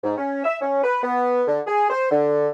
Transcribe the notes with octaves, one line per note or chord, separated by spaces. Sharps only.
G#2
C#4
E5
C#4
B4
B3
D3
G#4
C5
D3